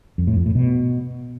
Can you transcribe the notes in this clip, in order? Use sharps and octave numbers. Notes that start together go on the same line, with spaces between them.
F2
A2
F2
A2
B2